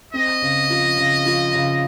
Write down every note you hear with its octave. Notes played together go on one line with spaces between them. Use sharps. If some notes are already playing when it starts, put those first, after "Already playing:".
C4 D#5
C#3
F3
C#3
F3
C#3